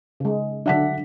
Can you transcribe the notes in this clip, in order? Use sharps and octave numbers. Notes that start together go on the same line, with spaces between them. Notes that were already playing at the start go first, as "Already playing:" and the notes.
C#3 G#3
D3 F#3 D4 E5 F#5 B6